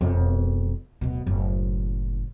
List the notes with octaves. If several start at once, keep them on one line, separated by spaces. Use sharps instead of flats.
E1 F2
D1 B2
F#1 A2